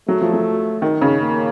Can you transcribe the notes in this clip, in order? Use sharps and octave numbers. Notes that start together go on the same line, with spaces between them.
F#3 A3
F3
F#3
D#3
C#3
A#3